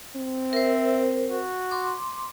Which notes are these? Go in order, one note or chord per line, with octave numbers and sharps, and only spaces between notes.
C4
A#4 C5 E5
F#4
C6 D6